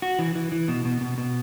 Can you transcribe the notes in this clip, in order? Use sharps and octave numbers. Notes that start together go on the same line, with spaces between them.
F#4
E3
E3
E3
B2
B2
B2
B2